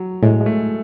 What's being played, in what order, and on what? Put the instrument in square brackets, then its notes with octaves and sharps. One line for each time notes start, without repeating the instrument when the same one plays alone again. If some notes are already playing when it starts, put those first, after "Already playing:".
Already playing: [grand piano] F#3
[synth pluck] A2 [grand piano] G#3
[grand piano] G#3
A3